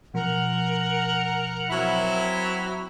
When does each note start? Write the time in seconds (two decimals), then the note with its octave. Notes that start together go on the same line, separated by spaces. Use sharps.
0.14 B2 F3 A#4 F#5
1.70 F#3 C4 E4